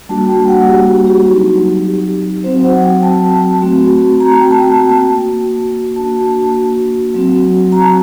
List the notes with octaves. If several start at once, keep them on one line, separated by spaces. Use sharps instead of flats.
G3 A#3 D4 F#4 A5
G5
F#5
G4
F#4
F#4
G4
F#3 C4 D#4 F#4
G4
F#3 C4 F#4 C5
F#5
G5
A5
A3 C4 F#4
A#5
A5
G5
A5
A#3 F#4
A#3 D4 F#4 A5
F#3 C4 F#4
A#5
A5